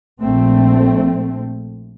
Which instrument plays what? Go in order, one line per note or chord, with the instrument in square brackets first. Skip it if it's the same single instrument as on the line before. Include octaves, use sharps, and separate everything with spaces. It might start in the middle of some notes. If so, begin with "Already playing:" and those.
[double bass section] A#1 A3 C4